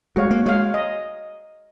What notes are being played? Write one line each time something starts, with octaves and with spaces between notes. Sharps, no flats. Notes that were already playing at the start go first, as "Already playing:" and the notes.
G#3 F#4 C#5 F5
A#3
G#3 F#4 C#5 F5
D#5